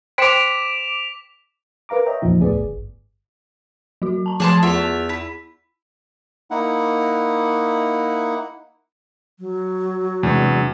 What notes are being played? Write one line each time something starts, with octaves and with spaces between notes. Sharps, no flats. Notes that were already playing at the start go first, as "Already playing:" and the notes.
C5 G5 C6 D6 B6 D7 E7 F7
A#4 B4 F5 A#5 D6
C#5 D#5 E5 G5 A#5
E2 A#2 C#3 F3 D#4
C#2 A2 B3 G#4 D5
G1
F#3 F#4
A5 A#5
F3 G#4 A5 C6 D6
E2 F4 E5 F#5 A5 F7
E4 B6
A#3 D#4 E4 F#5
F#3
E2 C3 G#3 D4